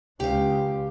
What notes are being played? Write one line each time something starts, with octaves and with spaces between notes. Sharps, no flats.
C#2 G4 F5